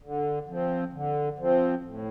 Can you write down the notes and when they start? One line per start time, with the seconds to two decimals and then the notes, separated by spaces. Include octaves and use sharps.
0.03 D3
0.48 F3 C4
0.93 D3
1.38 F3 C4
1.84 A2